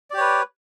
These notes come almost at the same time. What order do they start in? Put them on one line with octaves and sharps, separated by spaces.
D5 G4 C#5 B4